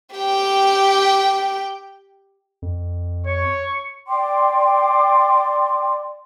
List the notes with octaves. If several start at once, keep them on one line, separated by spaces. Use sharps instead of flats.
G4 G5
F2
C#5 C#6
D5 G5 C6 D6